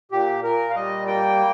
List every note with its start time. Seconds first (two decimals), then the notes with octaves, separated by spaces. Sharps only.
0.12 A#2 G4
0.43 A#2 A#4
0.70 F5
0.75 G3 D#5
1.07 A#3 G5